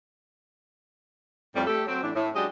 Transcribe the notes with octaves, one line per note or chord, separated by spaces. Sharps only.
F2 A2 G3
A3 G4 A4
F#3 C4
A2 E3 C#4 D4
A2
F#3 G#3 C#4 D4 G4 D#5